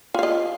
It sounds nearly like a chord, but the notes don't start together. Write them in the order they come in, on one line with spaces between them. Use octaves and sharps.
F4 F5 D#5